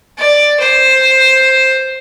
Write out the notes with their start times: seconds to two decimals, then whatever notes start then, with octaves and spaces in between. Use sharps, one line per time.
0.18 D5
0.60 C5